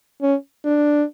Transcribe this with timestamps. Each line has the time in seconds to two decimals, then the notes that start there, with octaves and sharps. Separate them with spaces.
0.22 C#4
0.65 D4